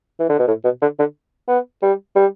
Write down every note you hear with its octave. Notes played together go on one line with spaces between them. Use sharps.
E3
D3
B2
A2
B2
D3
D3
B3
G3
G3